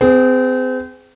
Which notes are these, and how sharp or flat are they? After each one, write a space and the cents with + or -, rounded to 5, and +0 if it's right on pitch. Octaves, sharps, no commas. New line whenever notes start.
C4 -35 G#4 +0